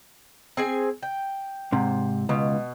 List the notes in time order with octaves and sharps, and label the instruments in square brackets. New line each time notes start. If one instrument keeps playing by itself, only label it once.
[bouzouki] C4 G#4 G#5
G5
[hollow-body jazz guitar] G#2 C3
[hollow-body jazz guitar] C#2 [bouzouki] B2